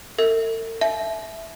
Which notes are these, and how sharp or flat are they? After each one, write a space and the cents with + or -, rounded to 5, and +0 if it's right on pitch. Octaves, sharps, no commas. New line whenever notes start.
A4 +45 E5 -30
E5 +0 A5 -40